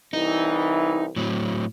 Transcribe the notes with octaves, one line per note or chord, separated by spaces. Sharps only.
C2 E3 D#4
A2 F#3 C4